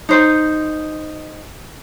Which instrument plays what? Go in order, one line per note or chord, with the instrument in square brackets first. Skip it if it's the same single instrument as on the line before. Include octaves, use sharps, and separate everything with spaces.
[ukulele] D#4 C5